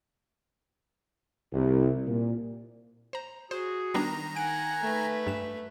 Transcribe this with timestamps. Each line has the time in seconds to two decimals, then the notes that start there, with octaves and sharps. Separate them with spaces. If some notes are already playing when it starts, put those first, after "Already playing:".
1.53 C2
2.07 A#2
3.13 C5 A#5
3.51 F#4 G#4 C5
3.94 D#3 G3 B3 D4 A#5
4.36 F#5 G#5 D7
4.82 A3 B4
5.27 G2 E7